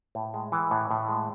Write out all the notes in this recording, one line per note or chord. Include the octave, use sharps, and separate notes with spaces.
A2
G#3
E3
A2
A2
G#3